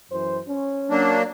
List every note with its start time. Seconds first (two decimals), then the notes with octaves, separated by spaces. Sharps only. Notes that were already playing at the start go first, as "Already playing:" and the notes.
0.12 F#2 E3 C5
0.48 C#4
0.90 F#3 A#3 D4